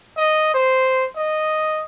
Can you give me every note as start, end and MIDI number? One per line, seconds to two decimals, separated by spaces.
0.17 0.50 75
0.54 1.05 72
1.16 1.83 75